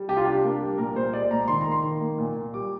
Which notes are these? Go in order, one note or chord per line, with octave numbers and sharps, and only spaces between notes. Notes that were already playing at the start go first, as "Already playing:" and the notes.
Already playing: G3
C3 G4
F4
D4 G4
A#3
G3
A#2 A#4
A#2 C5
G#3 D5
A#2 A#5
A#5
D#3 C6
A#5
A#3
C6
D#3
A#3
A#2
A#2
G3 D6